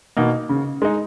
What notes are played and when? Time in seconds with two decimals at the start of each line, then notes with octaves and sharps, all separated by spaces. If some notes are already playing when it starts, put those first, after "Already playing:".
0.17 B2 A#3 D#4
0.49 C#3
0.82 G#3 D#4